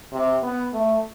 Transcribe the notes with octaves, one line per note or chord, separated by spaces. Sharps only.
C3
B3
A3